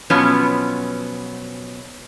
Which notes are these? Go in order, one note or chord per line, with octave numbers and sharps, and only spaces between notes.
B2 F3 F#3 B3 C#4